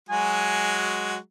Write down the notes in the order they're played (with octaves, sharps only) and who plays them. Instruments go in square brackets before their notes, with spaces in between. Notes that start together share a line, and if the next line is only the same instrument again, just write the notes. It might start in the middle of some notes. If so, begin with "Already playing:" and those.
[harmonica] F#3 G#3 F#4 [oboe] G#5